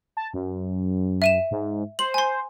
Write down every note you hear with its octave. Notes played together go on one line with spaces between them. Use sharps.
A5
F#2
E5 D#7 E7
G#2
C5 F#7
G#5 C6